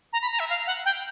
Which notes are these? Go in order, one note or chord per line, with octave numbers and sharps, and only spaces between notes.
A#5
B5
A#5
E5
F5
F#5
G5